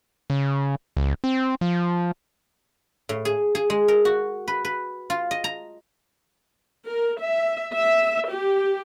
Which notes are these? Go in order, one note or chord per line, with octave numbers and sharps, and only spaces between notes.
C#3
C#2
C4
F3
A2
G#4
G#4
G#3
A#4
F#4
B4
B4
F4
D#5
A#5
A#4
E5
E5
G4